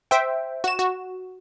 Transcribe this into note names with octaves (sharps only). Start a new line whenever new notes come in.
C5 E5 G5
F#4 E7
F#4